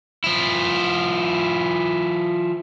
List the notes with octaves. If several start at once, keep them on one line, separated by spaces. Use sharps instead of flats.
F3 E4